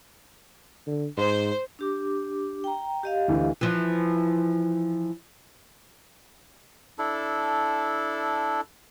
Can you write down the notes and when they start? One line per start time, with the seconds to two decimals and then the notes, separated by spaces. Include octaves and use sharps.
0.87 D3
1.18 G#2 C5
1.79 D4 G4 D6
2.64 G5 A#5
3.03 G4 D#5 F5
3.28 D2 E3
3.61 E3 F3
6.99 D4 E4 A4